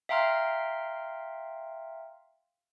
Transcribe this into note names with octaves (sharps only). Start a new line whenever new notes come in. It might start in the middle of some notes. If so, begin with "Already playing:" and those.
E5 F5 G5 A#5 C6 F6